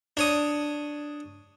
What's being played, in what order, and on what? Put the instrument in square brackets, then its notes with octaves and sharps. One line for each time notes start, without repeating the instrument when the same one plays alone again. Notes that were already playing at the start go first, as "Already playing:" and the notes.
[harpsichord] D4 C#5 D#6